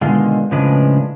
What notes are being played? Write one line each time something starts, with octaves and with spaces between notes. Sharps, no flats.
B2 D3 D#3 G#3 F4
A2 C#3 F3 G#3 D4 B4